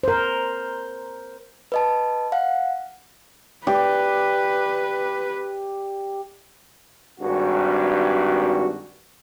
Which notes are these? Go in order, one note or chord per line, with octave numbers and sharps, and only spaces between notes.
A#4 C5
B4 D#5 A5
F5 F#5
G4 B4 D5
G#1 G2 F#4